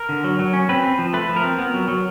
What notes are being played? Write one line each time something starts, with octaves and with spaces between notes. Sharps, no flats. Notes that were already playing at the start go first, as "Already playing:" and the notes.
Already playing: A#4
D3
F#3
F#3
C#4
C4 B4
C4
F3
A3 B4
F3
A#4
C4
B3
F#3
F#3